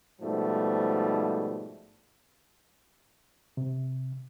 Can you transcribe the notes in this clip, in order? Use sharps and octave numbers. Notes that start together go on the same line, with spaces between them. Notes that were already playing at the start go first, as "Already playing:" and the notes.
G#2 B2 F3 G3 A3
C3